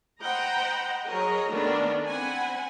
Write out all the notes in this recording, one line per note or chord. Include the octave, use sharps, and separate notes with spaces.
C5 D#5 F#5 G5 A#5 B5
F#3 G#4 A#4 C#5 D#5
D#3 A3 B3 D4 A#4
C4 F#5 G#5 B5